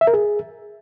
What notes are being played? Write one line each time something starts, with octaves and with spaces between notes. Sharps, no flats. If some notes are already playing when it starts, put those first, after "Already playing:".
E5
A#4
G#4